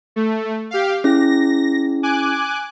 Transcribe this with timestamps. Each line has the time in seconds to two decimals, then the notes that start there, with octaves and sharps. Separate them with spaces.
0.16 A3
0.71 G4 F5
1.04 C#4 E4 G#4 A#6
2.03 G#5 D6 F#6